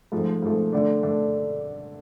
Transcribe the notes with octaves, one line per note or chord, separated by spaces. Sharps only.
G#2 F3 A3
G#2 F3 A3
D3 A3 D4
D3 A3 D4